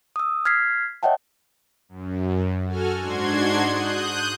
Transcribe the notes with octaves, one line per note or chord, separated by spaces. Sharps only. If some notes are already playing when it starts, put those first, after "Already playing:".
D#6 E6
F6 G#6 B6 C7
C#5 D#5 E5 F#5 G5 A5
F#2
F#4 A4 G#5 F6
G#2 D4 F#4 C6 G#6
D#6 F#6 G6